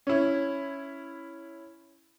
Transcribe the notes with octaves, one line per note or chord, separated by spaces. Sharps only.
C#4 E4